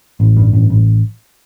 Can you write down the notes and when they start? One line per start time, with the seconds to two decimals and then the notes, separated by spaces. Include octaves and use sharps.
0.20 A1
0.37 G2
0.53 A1
0.70 A1